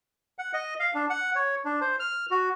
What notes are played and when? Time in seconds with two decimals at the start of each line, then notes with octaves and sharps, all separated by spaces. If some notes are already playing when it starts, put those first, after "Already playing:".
0.39 F#5
0.53 D#5
0.80 F5
0.94 D4
1.10 F#5
1.35 C#5
1.65 D4
1.81 C5
2.00 F6
2.31 F#4